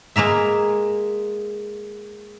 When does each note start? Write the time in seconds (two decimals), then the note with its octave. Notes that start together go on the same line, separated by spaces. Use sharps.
0.16 G#3 A#3 A#4 E5